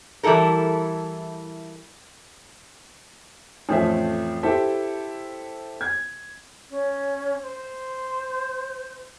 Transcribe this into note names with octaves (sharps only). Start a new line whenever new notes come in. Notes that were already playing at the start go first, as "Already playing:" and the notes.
E3 G3 E4 A4 A#4
A1 F2 F3 A3 C5 E5
E4 G4 A4 C5 E5 G5
G#6
C#4
C5